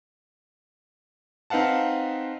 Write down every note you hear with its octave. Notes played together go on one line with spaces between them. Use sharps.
C4 D#4 B4 F5 F#5 A5